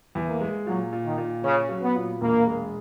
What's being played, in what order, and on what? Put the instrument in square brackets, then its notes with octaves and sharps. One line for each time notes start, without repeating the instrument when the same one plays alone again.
[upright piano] E2
[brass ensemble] A#3
[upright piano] G#3
[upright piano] A#2 [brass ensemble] F#3
[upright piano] A#2
[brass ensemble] D#3
[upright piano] A#2
[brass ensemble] C#3 [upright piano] C#4
[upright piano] F#3
[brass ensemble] B3
[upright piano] A#2
[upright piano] E1 [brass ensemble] A#3
[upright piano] G#3